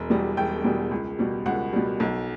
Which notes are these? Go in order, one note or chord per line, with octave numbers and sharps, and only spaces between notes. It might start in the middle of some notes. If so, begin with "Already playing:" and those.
Already playing: E1
E2 B2 G3
E1 G5
E2 B2 G3
C#2
B2 G3
C#2 F#5
B2 G3
B1